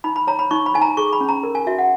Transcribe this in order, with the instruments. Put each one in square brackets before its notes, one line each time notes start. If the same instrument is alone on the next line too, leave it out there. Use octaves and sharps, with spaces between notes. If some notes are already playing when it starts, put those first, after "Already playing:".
[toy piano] D#4 B5
B5
C#5 A#5
B5
D#4 C#6
B5
D#4 G#5
A#5
G#4 C#6
B5
C#4
A#5
A#4
G#5
F#4 E5
F#5